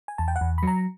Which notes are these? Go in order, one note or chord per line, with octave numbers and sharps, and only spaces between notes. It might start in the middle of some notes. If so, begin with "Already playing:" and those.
G#5
E2 A5
G5
F#5
E2
B5
F#3 A#5